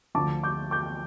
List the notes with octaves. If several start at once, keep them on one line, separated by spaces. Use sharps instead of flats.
D2 D3 F3 A5 D6
D6 G6
D6 G6